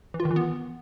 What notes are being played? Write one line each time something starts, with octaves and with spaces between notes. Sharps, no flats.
E3
F4
D#3
E3
B3